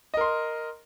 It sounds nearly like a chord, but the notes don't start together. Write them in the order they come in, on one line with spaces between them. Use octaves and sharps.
D#5 A#4 C6